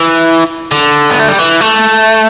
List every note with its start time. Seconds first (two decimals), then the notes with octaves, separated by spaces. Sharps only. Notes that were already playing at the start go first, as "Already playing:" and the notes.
Already playing: E3
0.71 D3
1.10 B3
1.20 A3
1.28 G3
1.38 E3
1.61 A3